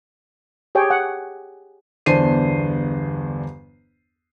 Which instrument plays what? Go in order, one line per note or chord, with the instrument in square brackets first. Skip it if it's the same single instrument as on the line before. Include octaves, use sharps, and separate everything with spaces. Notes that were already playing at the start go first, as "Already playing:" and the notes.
[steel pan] G4 G#4 C#5 G5
F#5
[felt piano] G1 E2 D4 C5 C7 D#7